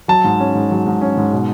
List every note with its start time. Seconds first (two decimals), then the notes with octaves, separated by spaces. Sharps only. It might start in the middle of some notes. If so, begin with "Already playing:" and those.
0.08 F#3 A5
0.24 G#2
0.40 C#4
0.55 G#2
0.71 F#3
0.86 G#2
1.01 C#4
1.17 G#2
1.33 B2